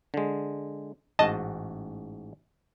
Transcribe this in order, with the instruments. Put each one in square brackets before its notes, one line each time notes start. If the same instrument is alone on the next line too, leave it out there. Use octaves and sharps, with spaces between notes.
[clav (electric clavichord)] D3 G#3
[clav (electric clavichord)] A1 G#2 F#4 [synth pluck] D#5 A5